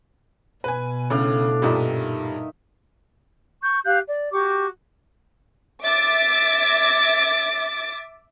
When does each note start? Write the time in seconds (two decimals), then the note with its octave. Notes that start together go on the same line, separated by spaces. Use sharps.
0.64 B2 B4 G#5
1.10 A2 C#3 D4 F5
1.62 G2 A#2 D#3 G3 D#4 E5
3.61 C#6 G6
3.84 G4 F5 F#6 G6
4.05 D5
4.31 F#4 G4 C#6 D6
5.84 E5 D6 A6 D7